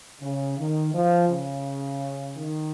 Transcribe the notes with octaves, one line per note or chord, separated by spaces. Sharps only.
C#3
D#3
F3
C#3
D#3